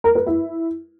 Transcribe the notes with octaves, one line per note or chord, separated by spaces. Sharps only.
A#4
B4
E4